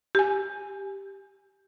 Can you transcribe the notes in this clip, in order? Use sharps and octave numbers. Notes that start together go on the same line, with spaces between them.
G4 G#5